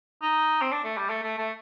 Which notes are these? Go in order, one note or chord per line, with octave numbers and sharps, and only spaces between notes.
D#4
C4
D4
A3
G3
A3
A3
A3